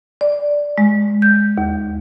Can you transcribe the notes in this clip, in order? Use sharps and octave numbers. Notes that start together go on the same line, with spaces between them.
D5
G#3
G6
D#2